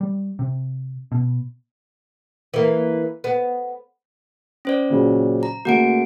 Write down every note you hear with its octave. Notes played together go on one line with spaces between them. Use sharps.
G3
C3
B2
E3 A#3
B3
C#4 C5 D5
A#2 C#3 F#3
A#5
C#3 A3 A#3 F#4 F#5 D7